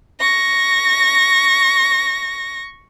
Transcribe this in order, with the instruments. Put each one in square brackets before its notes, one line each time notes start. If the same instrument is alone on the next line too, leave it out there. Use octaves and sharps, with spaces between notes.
[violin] C#6 A#6